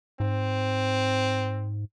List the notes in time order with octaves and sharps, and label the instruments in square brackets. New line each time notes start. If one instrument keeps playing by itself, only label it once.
[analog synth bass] G#2 [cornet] C4